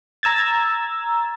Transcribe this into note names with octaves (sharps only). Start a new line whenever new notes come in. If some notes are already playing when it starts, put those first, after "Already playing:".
A#5 E6 G#6 A6